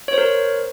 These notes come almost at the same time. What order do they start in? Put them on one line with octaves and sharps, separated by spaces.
C#5 C5 A#4